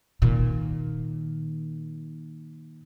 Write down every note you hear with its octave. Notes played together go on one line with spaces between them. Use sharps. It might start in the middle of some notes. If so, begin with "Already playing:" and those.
A#2 D#3